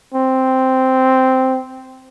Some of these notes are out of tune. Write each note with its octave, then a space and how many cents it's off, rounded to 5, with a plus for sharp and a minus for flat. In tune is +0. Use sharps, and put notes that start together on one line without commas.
C4 -5